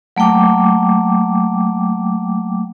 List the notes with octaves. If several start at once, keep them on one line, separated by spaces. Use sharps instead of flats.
F#3 A3 A#3 G5 D6